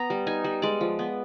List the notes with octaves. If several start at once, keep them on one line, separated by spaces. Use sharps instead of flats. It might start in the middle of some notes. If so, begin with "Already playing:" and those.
Already playing: B3 A#5
G3
D#4 G#5
G3
G#3 D5
F3
B3